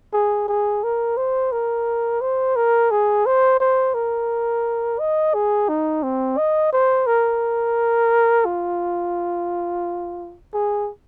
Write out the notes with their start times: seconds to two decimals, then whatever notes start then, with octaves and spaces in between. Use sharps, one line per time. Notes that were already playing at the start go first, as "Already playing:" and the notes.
0.13 G#4
0.48 G#4
0.84 A#4
1.17 C5
1.52 A#4
2.21 C5
2.56 A#4
2.91 G#4
3.26 C5
3.60 C5
3.94 A#4
5.00 D#5
5.34 G#4
5.69 D#4
6.03 C4
6.38 D#5
6.73 C5
7.07 A#4
8.45 F4
10.54 G#4